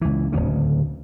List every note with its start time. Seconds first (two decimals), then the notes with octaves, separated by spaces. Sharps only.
0.01 C#2 E3
0.32 D1 G1 D2 C#3